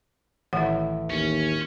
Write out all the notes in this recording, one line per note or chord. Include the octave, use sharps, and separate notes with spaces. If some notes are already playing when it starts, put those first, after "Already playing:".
A1 D#3 E4 F#5
D#2 C#4